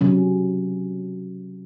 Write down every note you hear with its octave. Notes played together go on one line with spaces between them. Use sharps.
C3 F#3 C#4